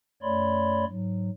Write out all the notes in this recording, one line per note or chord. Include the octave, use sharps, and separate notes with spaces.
F#2 A3 C#5 D5 B5 C6
G#2 F#3